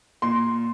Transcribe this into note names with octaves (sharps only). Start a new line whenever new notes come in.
A#2 C6